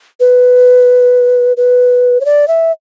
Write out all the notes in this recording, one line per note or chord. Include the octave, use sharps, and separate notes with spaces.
B4
B4
C#5
D5
E5